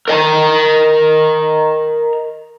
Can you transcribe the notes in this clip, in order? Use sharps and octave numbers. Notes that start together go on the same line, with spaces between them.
A#4 D#5 A5 A#5